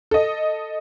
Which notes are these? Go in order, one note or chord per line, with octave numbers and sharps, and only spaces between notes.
A4 D#5